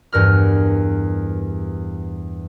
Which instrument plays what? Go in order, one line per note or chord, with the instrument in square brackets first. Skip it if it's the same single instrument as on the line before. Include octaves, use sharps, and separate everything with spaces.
[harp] E2 G2 A#4 F6